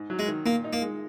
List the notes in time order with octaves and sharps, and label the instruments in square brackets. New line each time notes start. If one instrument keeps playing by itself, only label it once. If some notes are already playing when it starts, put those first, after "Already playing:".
Already playing: [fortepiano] G#2
F#3
[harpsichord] G#3
[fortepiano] D#3
[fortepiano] A#2 [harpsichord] A#3
[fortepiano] D#4
[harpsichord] A#3
[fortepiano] G#3